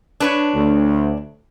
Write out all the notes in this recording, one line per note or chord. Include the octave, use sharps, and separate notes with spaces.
D4 B4 C#5
D2